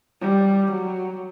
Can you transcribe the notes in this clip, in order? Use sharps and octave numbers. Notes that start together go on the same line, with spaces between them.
G3
F#3